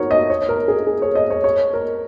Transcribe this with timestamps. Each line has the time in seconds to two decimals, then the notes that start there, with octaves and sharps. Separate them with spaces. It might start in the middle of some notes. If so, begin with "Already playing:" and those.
Already playing: D#4 F#4 A#4 C#5
0.11 D#5
0.30 C#5
0.49 A#4
0.68 G#4
0.87 G#4
1.02 C#5
1.15 D#5
1.30 C#5
1.44 C#5
1.73 A#4